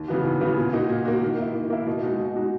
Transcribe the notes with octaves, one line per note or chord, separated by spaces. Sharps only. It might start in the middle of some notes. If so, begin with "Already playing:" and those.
Already playing: D#2
C#3 E3 B3 F#4
D#2
C#3 E3 B3 F#4
A#2
A#3 D#4 F#4
A#2
A#3 D#4 F#4
D#3
A#3 E4
D#3
A#3 E4
B2
G#3 D#4 F#4
B2
G#3 D#4 F#4